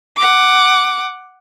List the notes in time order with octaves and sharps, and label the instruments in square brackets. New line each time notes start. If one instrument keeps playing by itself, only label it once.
[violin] F#5 D6